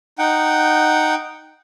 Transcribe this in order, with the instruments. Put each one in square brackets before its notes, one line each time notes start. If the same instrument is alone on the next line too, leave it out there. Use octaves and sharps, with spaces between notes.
[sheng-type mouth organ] D#4 F#5 G5